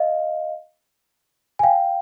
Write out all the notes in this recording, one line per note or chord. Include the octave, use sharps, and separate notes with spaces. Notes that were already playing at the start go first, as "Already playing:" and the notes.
Already playing: D#5 F5
G#5
F5 G5